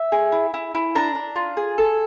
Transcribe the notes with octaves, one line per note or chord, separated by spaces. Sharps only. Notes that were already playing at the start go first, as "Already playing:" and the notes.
Already playing: E5
G#4
E4
E4
E4
D4 A#5
D4
F4
G#4
A4